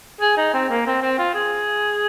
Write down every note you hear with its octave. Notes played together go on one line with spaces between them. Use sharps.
G#4
D#4
C4
A#3
C4
C4
F4
G#4